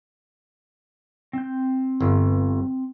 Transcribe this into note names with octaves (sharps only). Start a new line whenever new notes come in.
C4 G6
G1